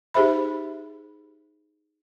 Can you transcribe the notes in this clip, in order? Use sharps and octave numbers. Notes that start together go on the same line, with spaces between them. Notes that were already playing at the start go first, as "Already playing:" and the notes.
D#4 G4 G#4 C5 E5 B5